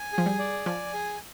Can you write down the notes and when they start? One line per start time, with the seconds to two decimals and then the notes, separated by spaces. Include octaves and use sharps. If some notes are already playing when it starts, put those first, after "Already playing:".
Already playing: G#5
0.13 G#4
0.18 F3
0.26 G3
0.39 D5
0.66 F3 G#5
0.94 G#4